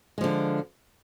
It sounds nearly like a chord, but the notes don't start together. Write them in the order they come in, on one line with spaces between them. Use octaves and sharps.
G#3 F3 D3